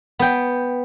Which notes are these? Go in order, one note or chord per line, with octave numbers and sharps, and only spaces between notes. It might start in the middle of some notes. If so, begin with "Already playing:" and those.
B3 G5